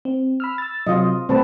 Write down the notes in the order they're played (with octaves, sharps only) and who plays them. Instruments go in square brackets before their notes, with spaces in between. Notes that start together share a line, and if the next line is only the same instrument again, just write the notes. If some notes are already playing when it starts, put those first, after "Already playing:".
[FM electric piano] C4
B5 E6 F6
E6 A6
[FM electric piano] C3 F#3 [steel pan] F4 D#5
[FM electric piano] B2 G3 A3 [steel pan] C4 B4 A5